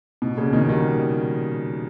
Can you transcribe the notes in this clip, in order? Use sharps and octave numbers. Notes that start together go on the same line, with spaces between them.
B2
A#2 C#3
B2 D#3
D#3 G3